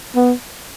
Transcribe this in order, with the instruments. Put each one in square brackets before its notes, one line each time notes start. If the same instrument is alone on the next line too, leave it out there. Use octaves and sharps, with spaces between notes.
[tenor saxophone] B3